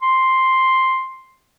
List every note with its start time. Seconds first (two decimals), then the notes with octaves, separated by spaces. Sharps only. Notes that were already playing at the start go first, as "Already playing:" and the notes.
0.03 C6